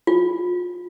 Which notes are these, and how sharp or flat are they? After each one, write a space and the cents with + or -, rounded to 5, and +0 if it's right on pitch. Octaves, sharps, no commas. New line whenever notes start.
F4 +30